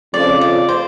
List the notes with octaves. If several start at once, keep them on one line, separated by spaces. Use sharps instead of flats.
F2 C#3 F3 D5
D5
C5